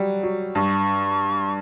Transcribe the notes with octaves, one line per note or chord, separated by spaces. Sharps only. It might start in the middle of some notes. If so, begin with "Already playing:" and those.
Already playing: F#3 G3
F#3
G2 C#6